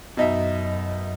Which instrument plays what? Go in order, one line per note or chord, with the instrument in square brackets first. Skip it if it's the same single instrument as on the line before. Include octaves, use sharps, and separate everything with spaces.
[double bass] F#2 [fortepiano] B2 D#4 E5